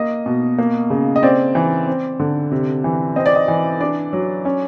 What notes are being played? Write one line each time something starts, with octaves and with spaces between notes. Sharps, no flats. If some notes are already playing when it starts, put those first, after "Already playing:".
Already playing: A#3 D#5
B2
A#3
C#3
D#5
C4 D5
E3
C4
D3
C3
E3
C4 D#5
D5
D#5
E3
D4 D5
F#3
C#4